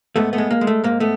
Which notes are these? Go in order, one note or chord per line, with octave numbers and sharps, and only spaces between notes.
G#2 A3 B3
A3 B3
G#3
A#3
G#3
A3
G#2 A#3
A3 B3